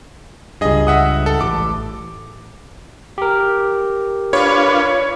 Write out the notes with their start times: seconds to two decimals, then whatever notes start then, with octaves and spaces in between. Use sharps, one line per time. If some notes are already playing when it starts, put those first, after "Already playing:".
0.61 C#2 G2 G#4 D#5
0.87 E5 F#5 D#6
1.26 A4
1.41 A1 D6
3.18 G4 A#4
4.33 D4 F4 B4 C#5